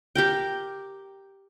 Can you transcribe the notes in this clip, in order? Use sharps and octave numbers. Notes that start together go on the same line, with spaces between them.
G4 A#4 G5